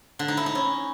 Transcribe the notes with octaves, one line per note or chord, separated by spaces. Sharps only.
D3
D#4
E4
D#4
C#4